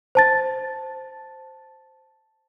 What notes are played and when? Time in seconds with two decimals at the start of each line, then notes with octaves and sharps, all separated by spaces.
0.15 C5 A5 A6